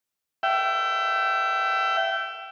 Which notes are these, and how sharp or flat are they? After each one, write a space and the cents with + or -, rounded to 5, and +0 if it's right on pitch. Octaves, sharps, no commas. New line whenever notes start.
E5 +25 G5 -25